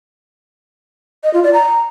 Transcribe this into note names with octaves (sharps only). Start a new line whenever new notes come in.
D#5
F4
D5
A#5